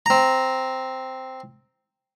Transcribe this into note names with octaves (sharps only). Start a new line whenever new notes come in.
C4 A#5